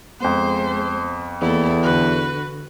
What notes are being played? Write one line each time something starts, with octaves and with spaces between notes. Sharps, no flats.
F2 G#3 B3 C5
E2 A#3 E4 A4
D3 F#4 B4